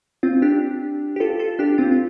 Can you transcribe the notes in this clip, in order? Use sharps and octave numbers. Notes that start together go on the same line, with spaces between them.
C4 F4
D4 G4
G4
F4 A4
F4 A4
D4 G4
C4 F4
F4